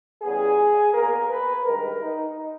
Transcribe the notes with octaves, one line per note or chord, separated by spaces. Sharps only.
E2 C#3 G3 B3 G#4
E2 B2 A#3 A#4
B4
G2 D#3 G#3 A#4
D#4